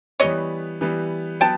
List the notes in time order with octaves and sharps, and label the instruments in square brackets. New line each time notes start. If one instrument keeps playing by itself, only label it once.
[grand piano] E3 G3 B3 [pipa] C#5 D#5
[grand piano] E3 G3 B3
[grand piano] F#3 B3 [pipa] G5 A5